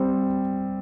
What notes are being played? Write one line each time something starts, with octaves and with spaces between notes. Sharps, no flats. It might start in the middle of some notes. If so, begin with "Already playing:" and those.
Already playing: G3 C4